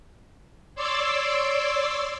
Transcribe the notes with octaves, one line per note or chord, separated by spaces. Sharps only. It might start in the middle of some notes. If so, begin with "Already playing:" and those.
C#5 D5 C6 D6 E6